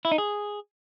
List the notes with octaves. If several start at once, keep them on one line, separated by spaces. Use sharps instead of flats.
E4
D#4
G#4